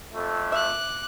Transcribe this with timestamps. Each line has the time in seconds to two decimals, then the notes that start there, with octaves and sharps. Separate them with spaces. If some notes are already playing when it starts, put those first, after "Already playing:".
0.14 F2 A3
0.52 E5 D6 F#6